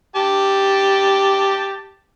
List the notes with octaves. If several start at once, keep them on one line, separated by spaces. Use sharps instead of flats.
G4 A5